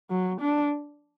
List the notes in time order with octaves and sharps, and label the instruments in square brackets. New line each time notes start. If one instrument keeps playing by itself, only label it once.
[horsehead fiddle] F#3
D4